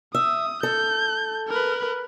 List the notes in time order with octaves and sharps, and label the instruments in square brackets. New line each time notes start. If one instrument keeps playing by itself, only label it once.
[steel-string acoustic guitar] E5 [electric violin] D#6
[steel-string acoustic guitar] A4 [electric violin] G6
[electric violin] A#4 B4